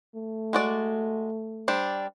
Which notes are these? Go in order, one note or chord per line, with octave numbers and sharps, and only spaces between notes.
A3
G#3 F#4 D5
G3 D4 C5